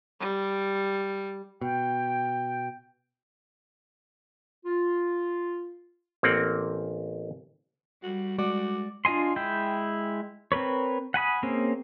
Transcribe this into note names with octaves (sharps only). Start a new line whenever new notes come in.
G3
B2 G5
F4
A1 A#3 C4 F#5
G3 F#4
G#3 F#4 D5
D4 F4 D#5 G#5 C6
G#3 E4 G5
C4 A#4 B4 C#5
F#5 G#5 B5 D#6
A#3 C4 C#4 G#4